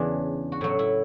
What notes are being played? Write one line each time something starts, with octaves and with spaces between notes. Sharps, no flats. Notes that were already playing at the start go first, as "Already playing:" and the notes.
Already playing: E2 C#3 E3 D4
F#4
A2 F#3 E4
E4